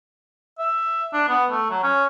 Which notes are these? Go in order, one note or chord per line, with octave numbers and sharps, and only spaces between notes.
E5
D4
B3
A3
F#3
C#4